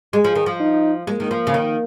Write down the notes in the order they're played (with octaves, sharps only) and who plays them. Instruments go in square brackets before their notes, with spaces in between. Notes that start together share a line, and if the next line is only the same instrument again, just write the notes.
[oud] G#3 [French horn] G#4
[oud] F3
D#3
F3
[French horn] D#4
[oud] G#3 [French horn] A#3
[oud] D#3
F3
C#3
D#3